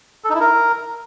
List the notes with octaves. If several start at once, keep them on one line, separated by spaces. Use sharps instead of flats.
A4
D#4
E4
A#4